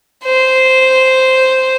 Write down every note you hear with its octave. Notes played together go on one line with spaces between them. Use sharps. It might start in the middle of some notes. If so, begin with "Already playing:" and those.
C5